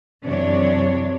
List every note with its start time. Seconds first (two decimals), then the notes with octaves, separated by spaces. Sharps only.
0.24 F#2 C3 E3 D4 C#5